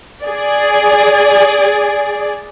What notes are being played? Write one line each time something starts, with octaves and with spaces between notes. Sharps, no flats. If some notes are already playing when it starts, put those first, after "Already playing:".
G#4 D5